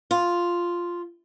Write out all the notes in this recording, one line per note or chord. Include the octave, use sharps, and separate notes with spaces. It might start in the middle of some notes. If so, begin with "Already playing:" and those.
F4